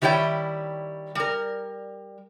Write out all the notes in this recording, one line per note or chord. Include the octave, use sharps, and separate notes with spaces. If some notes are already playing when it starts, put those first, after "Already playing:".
D#3 G3 E4 C#5 G5
G3 A#4